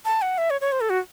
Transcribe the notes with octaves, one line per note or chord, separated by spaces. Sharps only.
A5
F#5
E5
C#5
C#5
C5
A4
F#4